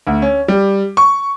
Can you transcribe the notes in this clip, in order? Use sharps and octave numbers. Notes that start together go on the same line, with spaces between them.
D2
C#4
G3
C#6